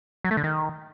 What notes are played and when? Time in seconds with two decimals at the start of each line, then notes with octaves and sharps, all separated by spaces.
0.24 F#3
0.31 A3
0.37 D3
0.44 D#3